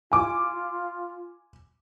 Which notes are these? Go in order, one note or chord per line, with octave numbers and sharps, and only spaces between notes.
F4 G#5 D6